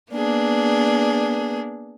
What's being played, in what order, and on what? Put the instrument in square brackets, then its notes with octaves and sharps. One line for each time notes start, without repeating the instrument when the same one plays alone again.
[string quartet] A#3 B3 D4 G#4